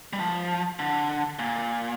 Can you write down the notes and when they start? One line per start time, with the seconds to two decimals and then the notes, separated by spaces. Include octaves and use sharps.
0.13 G3
0.20 F3
0.79 D3
1.39 A#2